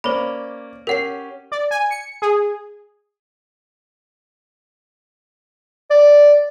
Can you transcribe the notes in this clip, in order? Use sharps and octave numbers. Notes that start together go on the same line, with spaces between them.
A#3 C#4 C5 D5 B5
C#4 G4 A#4 F#5 C7
D5
G#5
C#7
G#4
D5